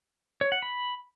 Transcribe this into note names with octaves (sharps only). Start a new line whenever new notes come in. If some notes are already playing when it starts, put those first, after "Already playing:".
C#5
F#5
B5